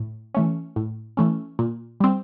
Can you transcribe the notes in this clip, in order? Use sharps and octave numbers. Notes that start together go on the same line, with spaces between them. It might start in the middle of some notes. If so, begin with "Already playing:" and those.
Already playing: A2
E3 A3 C#4
A2
E3 A3 C#4
A#2
G3 C4